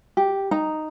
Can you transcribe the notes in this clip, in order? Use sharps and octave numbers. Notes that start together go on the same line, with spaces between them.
G4
D#4 A#5